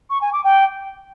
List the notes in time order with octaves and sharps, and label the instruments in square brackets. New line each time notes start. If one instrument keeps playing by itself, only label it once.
[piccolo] C#6
G#5
D6
G5